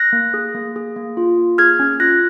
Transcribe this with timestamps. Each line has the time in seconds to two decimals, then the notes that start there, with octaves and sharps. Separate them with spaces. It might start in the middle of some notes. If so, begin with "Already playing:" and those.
Already playing: F#6 A#6
0.13 A#3
0.34 G#4
0.55 A#3
0.76 G#4
0.96 A#3
1.17 F4
1.38 A#3
1.58 G#4 F6 G#6
1.79 C#4
2.00 F4 F#6 A#6